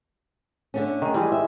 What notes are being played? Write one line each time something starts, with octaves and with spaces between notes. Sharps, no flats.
D3 A3 C#4
D#3 G#4
E3 G3 G#3
E5